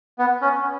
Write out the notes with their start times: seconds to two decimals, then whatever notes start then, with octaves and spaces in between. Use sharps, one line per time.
0.19 B3
0.42 C#4